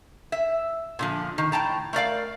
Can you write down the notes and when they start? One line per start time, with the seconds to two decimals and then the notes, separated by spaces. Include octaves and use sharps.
0.32 E5
0.99 A#2 D3 F3
1.38 D#3
1.52 A2 G5 A5 A#5
1.93 A3 A#4 D5 F5